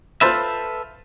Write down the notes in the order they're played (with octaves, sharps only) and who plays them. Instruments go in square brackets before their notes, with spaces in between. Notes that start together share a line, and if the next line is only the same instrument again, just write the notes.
[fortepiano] F4 C5 B5 [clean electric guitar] A4 B4 E5